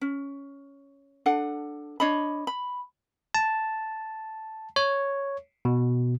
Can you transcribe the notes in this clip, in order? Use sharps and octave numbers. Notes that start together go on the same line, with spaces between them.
C#4
D4 A4 F#5
D4 C#5 D#5 B5
B5
A5
C#5
B2